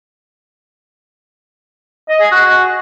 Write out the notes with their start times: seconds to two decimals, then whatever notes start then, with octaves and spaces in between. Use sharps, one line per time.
2.09 D#5
2.20 G#4
2.32 F#4